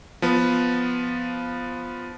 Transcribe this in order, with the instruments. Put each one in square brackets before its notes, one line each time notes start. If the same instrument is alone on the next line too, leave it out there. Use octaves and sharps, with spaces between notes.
[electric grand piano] F3 B3